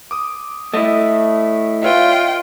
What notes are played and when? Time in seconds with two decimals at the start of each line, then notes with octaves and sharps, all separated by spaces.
0.11 D6 D#6
0.74 A3 E4 D#5
1.83 F4 B4 C#5 E5 G5